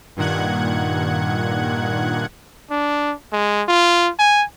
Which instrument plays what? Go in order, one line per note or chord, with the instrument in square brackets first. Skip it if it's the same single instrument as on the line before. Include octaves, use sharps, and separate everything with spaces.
[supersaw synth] G2 A#2 D#3 F#5 F#6 G#6
[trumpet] D4
G#3
F4
G#5